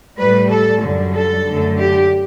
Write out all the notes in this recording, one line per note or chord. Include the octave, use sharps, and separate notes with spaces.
A2 G3 B4
A4
F#2 D3 G3
A4
F#2 D3 A3
G4